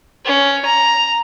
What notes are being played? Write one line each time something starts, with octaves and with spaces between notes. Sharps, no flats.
C#4
A#5